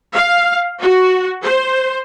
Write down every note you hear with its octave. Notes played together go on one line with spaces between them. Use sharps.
F5
F#4
C5